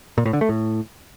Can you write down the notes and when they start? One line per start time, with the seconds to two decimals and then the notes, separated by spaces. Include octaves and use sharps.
0.18 A#2
0.25 A2
0.33 D3
0.41 A3
0.49 A2